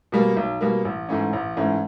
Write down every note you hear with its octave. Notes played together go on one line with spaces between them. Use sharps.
B2 G3 A#3
B1
B2 G3 A#3
A1
G#2 E3 A3 C#4
A1
G#2 E3 A3 C#4